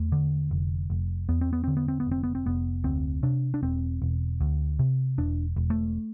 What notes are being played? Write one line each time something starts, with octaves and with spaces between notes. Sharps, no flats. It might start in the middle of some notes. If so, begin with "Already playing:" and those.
Already playing: E2 A3
D3
F1
F1
E2 B3
C4
B3
D3 C4
B3
C4
B3
F1 C4
B3
C4
F1 B3
D2 C4
C3 D4
D4
E1 C4
E1
D2
C3
E1 D4
E1
A3